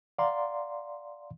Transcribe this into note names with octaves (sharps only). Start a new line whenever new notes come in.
D5 F5 F#5 A#5 C6